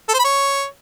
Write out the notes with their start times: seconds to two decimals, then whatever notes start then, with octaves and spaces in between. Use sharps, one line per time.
0.09 A4
0.14 C5
0.19 B5
0.24 C#5